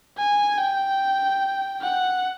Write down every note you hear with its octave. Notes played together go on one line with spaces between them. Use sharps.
G#5
G5
F#5